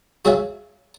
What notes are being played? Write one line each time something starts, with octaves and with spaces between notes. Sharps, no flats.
F#4 G#4 C#5 E5 F5 G#5